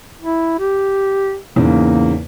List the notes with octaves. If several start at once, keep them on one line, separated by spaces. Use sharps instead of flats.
E4
G4
E2 G#2 C#3 A#3